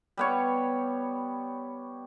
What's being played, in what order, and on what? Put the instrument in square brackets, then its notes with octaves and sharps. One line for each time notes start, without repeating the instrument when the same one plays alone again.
[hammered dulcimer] G3 B3 C#5